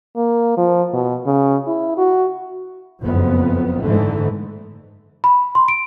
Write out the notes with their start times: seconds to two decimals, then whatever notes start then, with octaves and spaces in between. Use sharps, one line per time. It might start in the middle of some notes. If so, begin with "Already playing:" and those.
0.16 A#3
0.57 F3
0.93 B2
1.26 C#3
1.67 E4
1.98 F#4
3.02 F#1 F2 B3
3.82 G#2 D3 E3 A3
5.24 B5
5.55 C6
5.68 D7